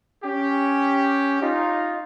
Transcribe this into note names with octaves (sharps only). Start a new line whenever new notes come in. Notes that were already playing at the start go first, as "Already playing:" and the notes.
C#4 G4
D#4 F4